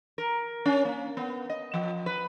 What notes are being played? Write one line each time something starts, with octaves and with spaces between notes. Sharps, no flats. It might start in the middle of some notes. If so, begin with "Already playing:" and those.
A#4
C#4
A#3
B3
D#5
F3
B4